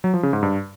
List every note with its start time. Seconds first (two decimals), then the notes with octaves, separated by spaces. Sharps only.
0.04 F#3
0.14 F3
0.23 C#3
0.33 G#2
0.43 G2